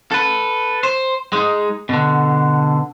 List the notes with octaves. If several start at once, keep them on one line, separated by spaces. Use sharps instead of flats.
A4 B4
C5
G#3 D#4
B2 D3